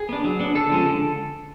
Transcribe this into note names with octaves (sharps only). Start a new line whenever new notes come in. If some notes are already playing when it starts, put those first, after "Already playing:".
Already playing: G#4
B3 D4
F#3
B3 D4
D3 A4
F3 G#3 C#4
D3